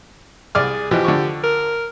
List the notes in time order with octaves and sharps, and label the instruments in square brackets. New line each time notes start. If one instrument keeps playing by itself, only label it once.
[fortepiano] C2 D5 F6 [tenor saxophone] G#4
[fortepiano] B2 E3 F3 [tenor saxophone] G4
[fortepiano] D3 F3 C#6
[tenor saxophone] A#4